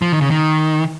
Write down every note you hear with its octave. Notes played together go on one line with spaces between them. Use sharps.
F3
D#3
C#3
D#3